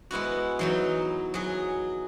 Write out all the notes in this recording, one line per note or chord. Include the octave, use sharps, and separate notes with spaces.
G#3 B3 E4 F#4
E3 F#3 D#4
F#3 G#4